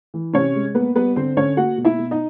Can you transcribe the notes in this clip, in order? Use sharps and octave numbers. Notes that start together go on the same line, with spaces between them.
E3
C3 C#4 C#5
G#3
A#3 B3 B4
G3 B3 B4
D3 C4 C5
D3 C#4 C#5
A#3 F#4 F#5
B2
E4 E5
B2
D#4 D#5